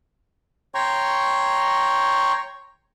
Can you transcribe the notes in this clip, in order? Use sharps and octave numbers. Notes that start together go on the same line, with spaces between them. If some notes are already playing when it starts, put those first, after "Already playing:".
C#5 G5 A#5 C6 C#6